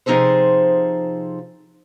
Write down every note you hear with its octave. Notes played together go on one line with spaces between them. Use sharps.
C3 F3 D#4 G#4 A4 C5